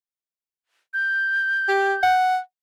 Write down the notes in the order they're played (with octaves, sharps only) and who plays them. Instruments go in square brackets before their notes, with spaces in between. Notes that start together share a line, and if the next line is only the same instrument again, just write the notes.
[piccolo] G6
[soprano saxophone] G4
F#5